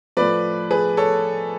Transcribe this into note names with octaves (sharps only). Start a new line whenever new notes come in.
A2 F3 B4 D5
G#4 B4
A4 C#5